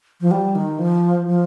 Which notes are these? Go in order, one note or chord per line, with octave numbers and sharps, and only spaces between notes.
F3
G3
D#3
F3
F3